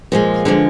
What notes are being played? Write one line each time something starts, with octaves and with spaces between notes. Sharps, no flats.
A#2 F3 G#3
D3 F3 G#3 D4